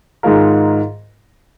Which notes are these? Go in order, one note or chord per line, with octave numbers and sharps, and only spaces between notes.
G#2 D#3 G#3 F4 A#4